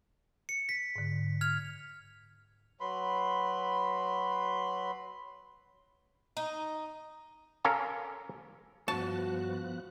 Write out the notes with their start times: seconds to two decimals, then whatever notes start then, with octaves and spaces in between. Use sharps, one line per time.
0.49 C#7
0.69 B6
0.96 G#2 D3
1.41 F6 G#6 F7
2.80 F#3 B4 B5 C6
6.37 D#4
7.64 C#4 A4 A#4 F5 G#5 A#5
8.88 G2 F3 B3 F#4 C#5 A5 F#6